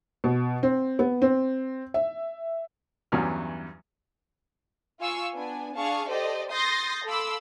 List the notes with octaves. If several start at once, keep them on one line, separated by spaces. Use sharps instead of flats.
B2
C4
B3
C4
E5
E2 G2 E3 F#3 C#4 F6
F4 F5 G#5 C#6 E6
B3 D4 G#5
D4 G#4 F5 A5 C#6
G4 A4 C5 D5 D#5
C6 D#6 G6 A6 A#6 C7
A4 F5 B5 C6 D6 E6